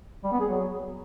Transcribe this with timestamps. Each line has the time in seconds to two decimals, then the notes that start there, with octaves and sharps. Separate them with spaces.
0.24 G3
0.32 B3
0.40 G#4
0.49 F#3